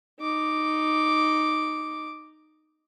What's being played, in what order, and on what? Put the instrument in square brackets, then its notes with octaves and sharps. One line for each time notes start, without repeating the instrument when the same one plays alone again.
[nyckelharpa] D#4 D6